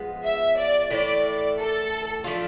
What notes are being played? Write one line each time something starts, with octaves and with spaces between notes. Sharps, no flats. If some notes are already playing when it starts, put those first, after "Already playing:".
Already playing: F3 G#3 B3
E5
D5
A2 E3 A3 D5
A4
F3 A3 D4 F4